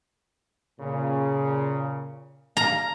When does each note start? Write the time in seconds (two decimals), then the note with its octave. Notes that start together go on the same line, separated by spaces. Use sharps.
0.80 A#2 C#3
2.57 F5 A#5